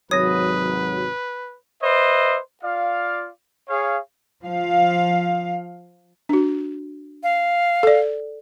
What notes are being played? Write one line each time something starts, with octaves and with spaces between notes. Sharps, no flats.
G#1 C3 F#3 B4 C#5 D#6 A#6
B4 C5 D#5 E5
F4 D5 F5
G#4 C#5 F5
F3 F5
D4 F#4
F5
A4 D5